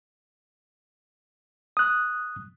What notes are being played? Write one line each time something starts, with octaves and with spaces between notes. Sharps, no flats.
D#6 F#6